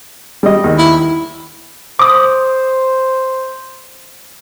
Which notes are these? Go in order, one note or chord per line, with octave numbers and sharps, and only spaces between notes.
G3 D#5
D#2
E4
C5 D6 D#6